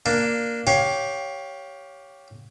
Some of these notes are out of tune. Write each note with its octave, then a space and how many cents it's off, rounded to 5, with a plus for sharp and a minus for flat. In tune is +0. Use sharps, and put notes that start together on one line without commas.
A#3 +0 D4 +0
G4 -5 C#5 +5 F5 +20